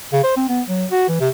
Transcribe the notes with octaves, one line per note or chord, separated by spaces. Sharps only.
C#3
C5
C4
B3
F#3
F#4
E3
C3